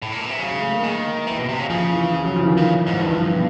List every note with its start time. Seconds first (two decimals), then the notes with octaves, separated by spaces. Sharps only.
0.02 A2
0.12 A#2
0.21 B2
0.31 C3
0.39 C#3 F#3
0.51 G#3
0.61 A3
0.72 A#3
0.84 D#3
1.27 E3
1.38 B2
1.49 C3
1.60 C#3
1.70 C#3 F3
1.92 E3
2.14 F3
2.24 F#3
2.36 F3
2.42 E3
2.47 D#3
2.57 C#3
2.87 G#2
3.01 G2 E3
3.11 F3
3.22 F3
3.33 B2